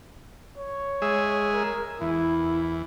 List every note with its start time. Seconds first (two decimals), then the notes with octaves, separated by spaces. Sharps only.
0.58 C#5
1.02 G#3 G#4 E5
1.54 A#4
2.01 E2 E4